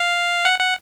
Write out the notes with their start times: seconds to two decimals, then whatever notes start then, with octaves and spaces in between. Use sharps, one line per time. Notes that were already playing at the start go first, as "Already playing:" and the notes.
Already playing: F5
0.45 F#5
0.59 F#5